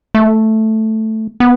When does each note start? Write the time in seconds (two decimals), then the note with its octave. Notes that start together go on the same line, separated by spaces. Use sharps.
0.15 A3
1.40 B3